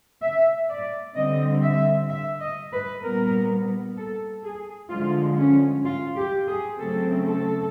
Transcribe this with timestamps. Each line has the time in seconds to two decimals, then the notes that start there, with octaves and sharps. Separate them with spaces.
0.22 E5
0.68 D5
1.15 D3 G3 C4 D#5
1.62 E5
2.09 E5
2.41 D#5
2.72 B4
3.03 A#2 G3 B3 A#4
3.96 A4
4.44 G#4
4.90 D3 F3 G#3 F4
5.38 C#4
5.85 F4
6.16 G4
6.47 G#4
6.78 C#3 F#3 A3 C4 A4
7.25 A4